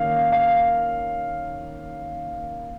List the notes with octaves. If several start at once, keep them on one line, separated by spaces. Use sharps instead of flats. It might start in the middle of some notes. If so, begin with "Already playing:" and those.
Already playing: D#3 A#3 C#4 F5
F5